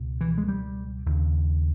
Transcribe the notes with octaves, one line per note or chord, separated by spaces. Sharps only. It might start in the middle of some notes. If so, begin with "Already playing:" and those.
Already playing: C#2 B2
E3
G#3
G3
D#2 C#3